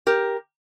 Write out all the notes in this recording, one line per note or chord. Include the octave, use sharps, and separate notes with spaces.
G4 A#4